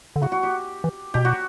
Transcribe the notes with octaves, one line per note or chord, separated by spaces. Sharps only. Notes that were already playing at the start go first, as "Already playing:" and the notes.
D3
C#3 F#4
F#4
G4
E3
B2 G4
F#4